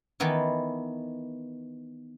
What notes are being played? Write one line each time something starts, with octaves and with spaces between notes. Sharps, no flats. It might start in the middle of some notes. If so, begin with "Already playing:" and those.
D#3 E3 B3 E4